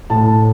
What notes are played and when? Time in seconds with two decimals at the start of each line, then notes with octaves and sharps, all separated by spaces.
0.10 A2 A5